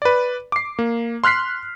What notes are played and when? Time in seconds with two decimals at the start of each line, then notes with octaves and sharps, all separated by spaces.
0.02 B4 D5
0.52 D6 C7
0.79 A#3
1.24 C6 F6 F#6 B6 C7